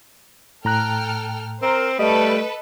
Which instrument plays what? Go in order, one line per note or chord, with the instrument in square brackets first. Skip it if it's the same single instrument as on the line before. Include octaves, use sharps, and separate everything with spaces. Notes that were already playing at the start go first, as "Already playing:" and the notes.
[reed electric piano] A2 A#5 F#6 [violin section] A4 G5 F6
[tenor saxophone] C4 [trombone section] A#4 [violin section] C5
[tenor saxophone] G3 [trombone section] A3 [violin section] A4 B4 [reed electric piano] D#5